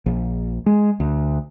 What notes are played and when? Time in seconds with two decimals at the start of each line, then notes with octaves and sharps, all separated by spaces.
0.06 A#1
0.66 G#3
1.00 D2